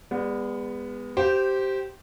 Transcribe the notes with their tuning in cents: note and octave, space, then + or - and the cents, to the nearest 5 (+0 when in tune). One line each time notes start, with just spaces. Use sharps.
G#3 -35 B3 +0 D5 +0
G4 -15 C5 -5